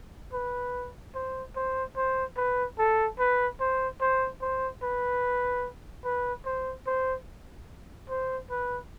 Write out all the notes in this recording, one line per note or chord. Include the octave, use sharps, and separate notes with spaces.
B4
C5
C5
C5
B4
A4
B4
C5
C5
C5
B4
B4
C5
C5
C5
B4